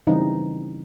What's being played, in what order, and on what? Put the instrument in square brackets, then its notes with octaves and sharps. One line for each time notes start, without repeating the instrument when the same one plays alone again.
[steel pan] C#3 E3 G3 C4 D#4